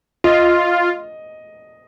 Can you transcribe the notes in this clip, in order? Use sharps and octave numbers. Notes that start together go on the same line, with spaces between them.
F4 D#5